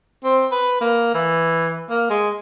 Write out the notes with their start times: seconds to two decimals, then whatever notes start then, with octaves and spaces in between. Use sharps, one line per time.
0.24 C4
0.52 B4
0.81 A#3
1.14 E3
1.90 A#3
2.10 G#3